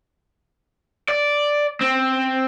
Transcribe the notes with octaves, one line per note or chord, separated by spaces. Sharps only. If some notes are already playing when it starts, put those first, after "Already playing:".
D5
C4